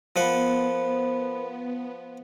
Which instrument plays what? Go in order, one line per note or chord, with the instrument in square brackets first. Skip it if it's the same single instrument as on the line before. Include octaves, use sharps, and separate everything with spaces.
[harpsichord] F3 F#5 [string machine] B3 [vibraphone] A#4 C5 B5